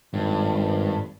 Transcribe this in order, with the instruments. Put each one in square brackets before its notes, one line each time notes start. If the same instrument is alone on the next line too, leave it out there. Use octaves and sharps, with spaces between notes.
[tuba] G#1 [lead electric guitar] G2